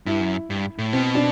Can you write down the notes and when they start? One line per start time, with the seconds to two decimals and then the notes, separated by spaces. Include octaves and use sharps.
0.06 G2 E4
0.21 F#2
0.50 G2
0.78 A2
0.93 B2 C4
1.15 D4